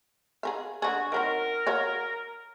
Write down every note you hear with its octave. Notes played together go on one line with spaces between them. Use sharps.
G#4 A#4 F5
D3 F#4 G#4
D#3 F#3 C4 A#4
F#4 C#5 F5